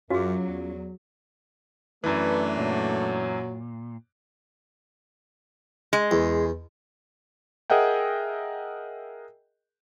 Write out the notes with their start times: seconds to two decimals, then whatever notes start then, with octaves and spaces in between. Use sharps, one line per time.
0.10 F#2 F#3 C#4 F4 F#4 G#4
0.46 E2
2.04 F#2 E3 A3 D4 B4
2.57 A#2 F#3
5.93 G#3
6.11 E2
7.70 G#4 A#4 D#5 E5 F#5 G5